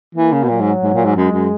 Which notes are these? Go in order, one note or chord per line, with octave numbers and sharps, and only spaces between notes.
E3 A#3
C#3
B2
A#2 F#3
G#2
G#2
A#2
G#2
F#2 G#3
F#2